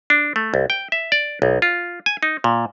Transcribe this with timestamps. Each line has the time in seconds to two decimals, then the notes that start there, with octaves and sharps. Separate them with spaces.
0.10 D4
0.36 A3
0.54 C2
0.70 G5
0.92 E5
1.12 D5
1.42 B1
1.62 F4
2.06 G#5
2.23 D#4
2.44 A#2